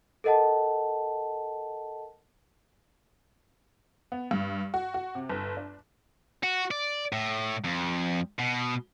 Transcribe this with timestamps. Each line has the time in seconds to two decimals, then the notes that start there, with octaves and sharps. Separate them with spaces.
0.24 A4 A#4 D#5 F#5 A5
4.12 B3
4.31 G2
4.74 F#4
4.94 F#4
5.15 C3
5.29 G1
5.57 D4
6.43 F#4
6.71 D5
7.13 A2
7.64 F2
8.39 B2